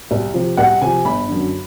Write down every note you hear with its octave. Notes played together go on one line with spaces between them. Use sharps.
C2
C3 F3
C2 F#5
C3 F3 G#5
G1 B5
F#2 D3